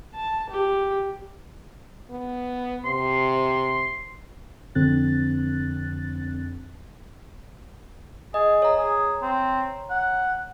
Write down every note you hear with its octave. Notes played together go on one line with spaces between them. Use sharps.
A5
G4
B3
C3 C6
F2 D3 C4 F#6 A6
G#4 D#5
C#5 A#5
G#4
C4
F#5